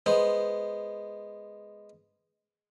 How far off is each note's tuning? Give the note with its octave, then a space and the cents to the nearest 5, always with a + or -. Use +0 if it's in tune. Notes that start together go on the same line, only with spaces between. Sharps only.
G#3 +0 B3 +0 C5 +0